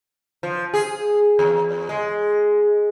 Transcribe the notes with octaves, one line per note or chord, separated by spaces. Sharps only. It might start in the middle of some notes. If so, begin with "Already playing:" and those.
F3
G#4
E2
G#3